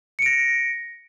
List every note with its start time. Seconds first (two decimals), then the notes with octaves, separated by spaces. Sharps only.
0.19 C#7
0.22 D7
0.26 A#6